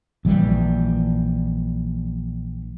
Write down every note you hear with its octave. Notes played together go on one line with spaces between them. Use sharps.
A#1 E3 G3